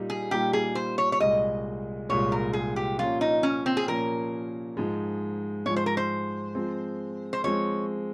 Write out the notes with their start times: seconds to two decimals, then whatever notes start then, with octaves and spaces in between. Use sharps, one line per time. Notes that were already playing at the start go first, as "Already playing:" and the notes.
Already playing: A#2 G3 A#3 D#4
0.10 G#4
0.31 A#2 G3 A#3 D#4 G4
0.53 G#4
0.75 C5
0.98 C#5
1.12 C#5
1.20 C2 A#2 G#3 D#5
2.09 C2 A#2 G#3 C#5
2.32 A#4
2.53 G#4
2.76 G4
2.98 A#2 F3 A#3 C#4 F4
3.21 D#4
3.43 C#4
3.66 C4
3.77 G#4
3.88 A#2 F3 A#3 C#4 A#4
4.77 G#2 F3 G#3
5.66 G#2 F3 G#3 C#5
5.76 C5
5.86 A#4
5.97 C5
6.55 F3 G#3 C4
7.33 C5
7.44 F3 G#3 C4 C#5